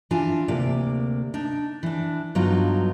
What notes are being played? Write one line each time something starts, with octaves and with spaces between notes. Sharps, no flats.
E3 D4 F4 G#5
D2 C3 A#3 D5
D4 D#4
E3 D4
G2 D3 F#3 B3 D#4 F4